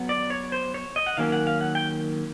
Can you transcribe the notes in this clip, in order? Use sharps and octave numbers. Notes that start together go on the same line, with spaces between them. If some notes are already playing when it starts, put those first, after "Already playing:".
Already playing: F#3 B3
D5
C#5
C5
C#5
D#5
F#5
D#3 F#3 A#3 C#4 F5
F#5
F5
F#5
G5